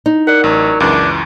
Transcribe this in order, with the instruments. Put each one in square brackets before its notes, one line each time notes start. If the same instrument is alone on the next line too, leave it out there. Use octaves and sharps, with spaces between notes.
[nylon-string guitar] D#4
[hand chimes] A#4 D5 [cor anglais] F#5
[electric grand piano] A1 [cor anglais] F#3
[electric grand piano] C#2 F#2 E3 [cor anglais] D4